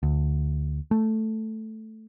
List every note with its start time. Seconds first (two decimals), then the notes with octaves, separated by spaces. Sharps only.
0.03 D2
0.91 A3